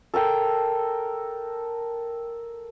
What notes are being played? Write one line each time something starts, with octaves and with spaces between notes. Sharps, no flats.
A4 A#4 G5